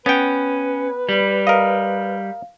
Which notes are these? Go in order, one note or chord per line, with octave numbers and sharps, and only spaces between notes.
B3 C#4 B4 G5
G3
A#4 D#5 F5